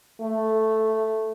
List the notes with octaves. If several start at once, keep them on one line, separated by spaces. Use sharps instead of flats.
A3